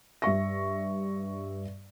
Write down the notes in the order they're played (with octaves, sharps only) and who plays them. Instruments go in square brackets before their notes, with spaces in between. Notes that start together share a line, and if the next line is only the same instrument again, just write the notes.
[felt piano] G2 E5 C#6 A#6